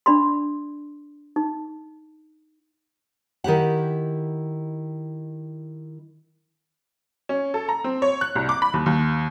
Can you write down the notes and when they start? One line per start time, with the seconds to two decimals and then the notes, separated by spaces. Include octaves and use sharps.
0.06 D4 D5 B5 C6
1.36 D#4
3.44 D#3 E4 G4 F#5
7.29 C#4
7.54 A4
7.69 A#5
7.84 C4
8.02 C#5
8.21 F#6
8.35 C2
8.49 D6
8.62 B5
8.74 D#2
8.86 D#2